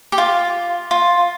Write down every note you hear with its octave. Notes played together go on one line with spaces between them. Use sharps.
G4
F4
F4